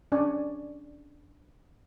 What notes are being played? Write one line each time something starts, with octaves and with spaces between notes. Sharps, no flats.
C#4 D4 D5 G#5 C#6